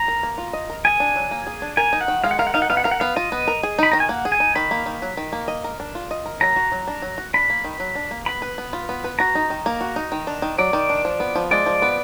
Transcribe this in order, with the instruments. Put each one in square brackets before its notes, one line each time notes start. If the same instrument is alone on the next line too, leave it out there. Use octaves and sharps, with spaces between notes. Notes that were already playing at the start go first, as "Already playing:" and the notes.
Already playing: [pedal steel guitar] A#5
[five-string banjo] A#4
A#3
F4
D#5
A#4
[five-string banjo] G#4 [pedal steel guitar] G#5
[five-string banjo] D4
F#3
A#3
G#4
D4
[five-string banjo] A#4 [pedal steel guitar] G#5
[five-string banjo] D#4
[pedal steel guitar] F#5
[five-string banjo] D#3
[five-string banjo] G#3 [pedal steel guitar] F5
[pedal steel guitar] F#5
[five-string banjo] A#4 [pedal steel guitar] F5
[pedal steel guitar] F#5
[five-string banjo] D#4 [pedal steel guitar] F5
[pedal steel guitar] F#5
[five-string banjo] B3 [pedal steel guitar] F5
[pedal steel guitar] F#5
[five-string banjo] A#4 [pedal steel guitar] F5
[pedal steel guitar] F#5
[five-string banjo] B3 [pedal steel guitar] F5
[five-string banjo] F4 [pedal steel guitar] D#5
[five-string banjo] B3
A#4
G#4
[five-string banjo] D#4 [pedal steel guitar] B5
[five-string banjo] D#3 [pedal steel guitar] A#5
[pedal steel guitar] G#5
[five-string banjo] A#3 [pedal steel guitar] F#5
[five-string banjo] G#4
[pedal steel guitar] G#5
[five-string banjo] D#4
[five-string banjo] D#3 [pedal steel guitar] B5
[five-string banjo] A#3
D#3
F#3
D#3
A#3
D#5
A#4
D4
F4
D#5
A#4
[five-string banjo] F#3 [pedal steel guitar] A#5
[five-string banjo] F#4
F#3
D4
F#3
F#4
[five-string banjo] D4 [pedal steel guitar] B5
[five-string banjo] A#3
D#3
F#3
D4
A#3
[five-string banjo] B3 [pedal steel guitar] B5
[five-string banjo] B4
B3
F4
B3
B4
[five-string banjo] F#4 [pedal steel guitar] A#5
[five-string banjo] D#4
D#3
A#3
F#4
D#4
D#3
D4
D#3
[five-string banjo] F#3 [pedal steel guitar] D5
[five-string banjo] D#3
D4
F3
B3
F3
[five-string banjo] G#3 [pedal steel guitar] D5
[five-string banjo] F3
B3